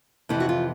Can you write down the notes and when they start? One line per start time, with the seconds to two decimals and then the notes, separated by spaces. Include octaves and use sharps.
0.29 F2 C3 E3 E4
0.40 F#4
0.49 F4